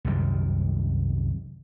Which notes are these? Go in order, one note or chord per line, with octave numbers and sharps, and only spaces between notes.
C2 F#2 D#3 G3